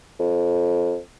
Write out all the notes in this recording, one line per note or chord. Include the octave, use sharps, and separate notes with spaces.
F2